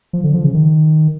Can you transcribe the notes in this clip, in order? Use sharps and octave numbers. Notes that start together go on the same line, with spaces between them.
F3
D3
F3
C#3
D#3